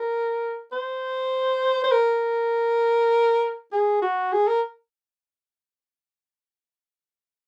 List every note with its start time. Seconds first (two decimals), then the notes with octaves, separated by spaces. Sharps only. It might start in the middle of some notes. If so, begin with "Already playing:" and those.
Already playing: A#4
0.72 C5
1.84 C5
1.92 A#4
3.72 G#4
4.02 F#4
4.32 G#4
4.47 A#4